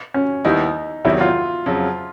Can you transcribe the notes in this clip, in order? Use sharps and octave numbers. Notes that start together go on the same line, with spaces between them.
C#4
D#2 D#3 G3 B3 D#4 E4
E2 C3 D#3 F#3 E4
F4
F2 C#3 F#3